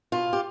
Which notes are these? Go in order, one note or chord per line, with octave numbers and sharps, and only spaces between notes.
B2 F4
G4